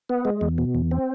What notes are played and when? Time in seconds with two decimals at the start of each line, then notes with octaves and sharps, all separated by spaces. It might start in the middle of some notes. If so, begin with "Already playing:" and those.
0.09 B3
0.25 G#3
0.41 E2
0.58 B2
0.75 E2
0.91 C4